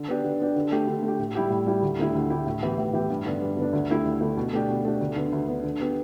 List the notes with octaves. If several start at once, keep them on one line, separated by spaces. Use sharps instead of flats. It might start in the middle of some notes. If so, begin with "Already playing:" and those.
Already playing: D3
B3 D4 G4
D3
B3 D4 G4
D3
A3 G4
D3
A3
G4
A2
G3 E4 G4
A2
G3 E4 G4
D2
D3 A3 E4 G4
D2
D3 A3 E4 G4
A2
E3 B3 G4
A2
E3 B3 G4
G2
D3 B3 D4
G2
D3 B3 D4
D2
D3 A3 E4 G4
D2
D3 A3 E4 G4
B2
A3 D4 G4
B2
A3 D4 G4
D2
D3 B3
D2
D3 B3
D3
B3 G4